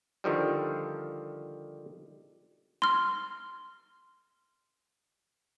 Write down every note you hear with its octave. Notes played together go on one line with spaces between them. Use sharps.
D3 D#3 F3 G3
C6 F6